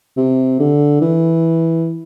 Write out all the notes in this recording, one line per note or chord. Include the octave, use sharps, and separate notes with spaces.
C3
D3
E3